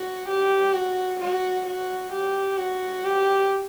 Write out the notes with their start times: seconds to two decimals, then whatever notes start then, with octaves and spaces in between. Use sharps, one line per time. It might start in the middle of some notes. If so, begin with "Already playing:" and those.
Already playing: F#4
0.28 G4
0.74 F#4
1.20 F#4
1.66 F#4
2.12 G4
2.58 F#4
3.04 G4